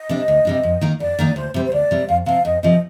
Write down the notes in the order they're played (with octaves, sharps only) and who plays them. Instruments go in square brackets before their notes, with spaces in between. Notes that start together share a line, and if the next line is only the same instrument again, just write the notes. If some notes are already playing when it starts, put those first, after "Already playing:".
Already playing: [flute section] D#5
[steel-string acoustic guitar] C3 G3 D4
D2
C3 G3 D4
F2
D#3 A#3 D#4
[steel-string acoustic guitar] F2 [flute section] D5
[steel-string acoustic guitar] D#3 A#3 D#4
[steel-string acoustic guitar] D2 [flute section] C5
[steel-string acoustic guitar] C3 G3 [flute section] C5
[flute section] C5
[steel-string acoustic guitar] D2 [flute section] D5
[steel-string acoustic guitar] C3 G3
[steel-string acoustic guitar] F2 [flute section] F5
[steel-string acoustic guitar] C3 F3 [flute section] F5
[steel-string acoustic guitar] F2 [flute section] D#5
[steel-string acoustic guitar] C3 F3 [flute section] D#5